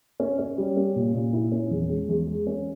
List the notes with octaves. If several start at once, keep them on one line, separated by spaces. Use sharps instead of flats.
C#4
C#4
G3
C#4
A#2
A#2
E4
C#4
E2
G#3
E2
G#3
C#4